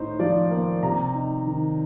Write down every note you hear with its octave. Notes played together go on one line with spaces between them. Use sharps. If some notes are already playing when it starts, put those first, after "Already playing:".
Already playing: A2 D#4 C5
F3 D5
A#3
C3 A#5
D#4
D#3